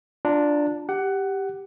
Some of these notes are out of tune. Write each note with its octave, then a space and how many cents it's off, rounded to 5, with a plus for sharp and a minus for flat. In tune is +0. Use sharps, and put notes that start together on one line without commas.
D4 +0 F4 +0 A#5 -25
G4 +0 F#5 +15